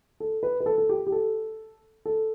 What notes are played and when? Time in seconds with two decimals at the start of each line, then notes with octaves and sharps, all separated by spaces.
0.20 A4
0.43 B4
0.60 B4
0.66 A4
0.78 A4
0.89 G4
1.07 G4
1.12 A4
2.05 A4